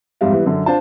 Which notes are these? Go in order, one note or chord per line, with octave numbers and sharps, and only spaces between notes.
F2 G#2 G3 E5 F5
E3 G3 B3
F#2 D3
D4 F4 C5 A5